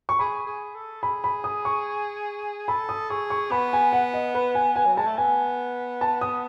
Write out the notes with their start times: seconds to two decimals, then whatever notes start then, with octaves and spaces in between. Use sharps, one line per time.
0.09 C#6
0.19 G#4 B5
0.47 G#4
0.75 A4
1.02 G#4 B5
1.24 B5
1.44 D#6
1.65 C#6
2.68 A4 B5
2.89 D#6
3.10 G#4 C#6
3.30 C#6
3.51 B3 B5
3.73 G#5
3.93 F#5
4.13 D#5
4.35 B4
4.55 G#5
4.76 G#5
4.86 F#3
4.96 G#3 A5
5.07 A3
5.18 B3 G#5
6.01 A5
6.21 D#6